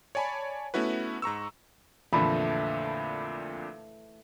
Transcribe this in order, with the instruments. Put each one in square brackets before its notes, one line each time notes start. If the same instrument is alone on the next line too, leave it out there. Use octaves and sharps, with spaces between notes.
[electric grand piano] C#5 D5 G#5 A5 B5
A3 B3 C#4 E4 F#4 B4
G#2 A#5 C#6 E6
[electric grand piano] F2 A#2 D3 [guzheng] E3 A3 [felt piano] B5